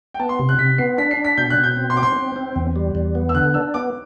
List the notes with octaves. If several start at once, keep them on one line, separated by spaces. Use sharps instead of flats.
G5
B3 A5
C6
C3
F#6
C3 B6
B3 C7
D4 B6
C7
D4
B6
B2 G6
F#6
B2
G6
C4
C6
C4 D6
C6
C4
C4
E2
G3
E2
B3
E6
D3 F#6
D4 E6
B3 D6